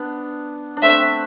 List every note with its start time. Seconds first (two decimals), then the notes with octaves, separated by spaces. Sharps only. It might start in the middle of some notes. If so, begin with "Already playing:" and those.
Already playing: B3 D4
0.77 D4
0.82 A3 C4 E5